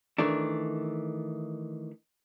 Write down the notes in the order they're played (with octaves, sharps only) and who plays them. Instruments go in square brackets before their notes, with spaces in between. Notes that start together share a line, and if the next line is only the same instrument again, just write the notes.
[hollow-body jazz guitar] D#3 E3 A3 D4